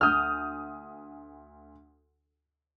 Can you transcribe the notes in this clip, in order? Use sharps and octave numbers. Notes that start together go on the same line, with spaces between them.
D2 D#6 F6 G6